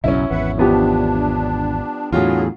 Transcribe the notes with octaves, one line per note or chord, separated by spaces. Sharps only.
F#1 B1 F#2 C#4 E4
G#1 E2 B4 E5 F#5
F3 B3 D4 G4
E2 A2 D3 F#3 F4 G#4